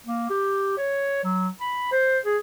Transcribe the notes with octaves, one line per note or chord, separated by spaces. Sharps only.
A#3
G4
C#5
F#3
B5
C5
G#4